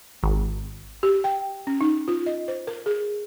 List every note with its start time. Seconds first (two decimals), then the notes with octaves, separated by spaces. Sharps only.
0.23 G#1
1.03 G4
1.24 G5
1.67 C#4
1.81 D#4
2.08 F4
2.26 D#5
2.48 C5
2.67 A#4
2.86 G#4